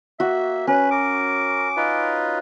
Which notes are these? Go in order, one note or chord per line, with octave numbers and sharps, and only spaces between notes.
A#3 F#4 E5
C#4 B4
A#4 D6
D#4 F4 B4